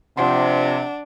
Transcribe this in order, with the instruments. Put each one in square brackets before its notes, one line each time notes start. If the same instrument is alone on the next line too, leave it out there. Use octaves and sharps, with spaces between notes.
[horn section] C3 [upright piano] F3 C6 [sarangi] D4 [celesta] F#5